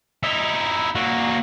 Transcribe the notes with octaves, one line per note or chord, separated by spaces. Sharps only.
D#4 E4
A#3 F#4